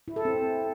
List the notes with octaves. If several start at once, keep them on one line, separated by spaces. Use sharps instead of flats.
E4
A4
C4